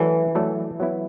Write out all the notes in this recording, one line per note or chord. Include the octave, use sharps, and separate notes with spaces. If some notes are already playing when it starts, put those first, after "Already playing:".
Already playing: E3 F#3 A3 E4 A4 D5
F#3 A3 E4 A4 D5
F#3 B3 E4